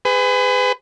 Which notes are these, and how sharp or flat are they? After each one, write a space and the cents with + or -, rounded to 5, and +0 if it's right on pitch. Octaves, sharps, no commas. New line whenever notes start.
G#4 -20 B4 +35